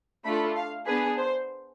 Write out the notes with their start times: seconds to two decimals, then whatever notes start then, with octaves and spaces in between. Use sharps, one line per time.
0.25 A3 D4 F4 A4 B5
0.55 F5
0.86 B3 D4 G#4 B4
1.17 C5